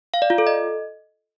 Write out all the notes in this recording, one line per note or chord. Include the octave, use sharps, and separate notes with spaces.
F5
D5
F4
A4
D#5